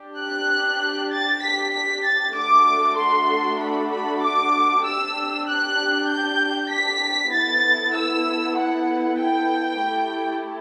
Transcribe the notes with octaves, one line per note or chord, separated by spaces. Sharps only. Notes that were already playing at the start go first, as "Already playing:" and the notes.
Already playing: D4 G4
F#6
A6
B6
B6
A6
A3 D4 F#4 A4 D6
C6
B5
B5
D6
D4 G4 E6
F#6
G6
B6
B3 E4 A4 A6
E6
F#5
G5
A3 E4 G4